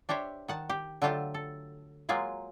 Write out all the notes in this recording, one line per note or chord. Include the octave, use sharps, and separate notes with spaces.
D4 G4 C5 C#5 E5
D#3 F#5 A5
G4
D3 F#3 A3 F4 G4 A5
A4
F#3 G#3 A#3 F4 G#4